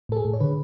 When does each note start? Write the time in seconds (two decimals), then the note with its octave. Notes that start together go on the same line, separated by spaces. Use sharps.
0.09 A2 A4
0.17 G#4
0.25 A2
0.33 C#5
0.40 D3 B4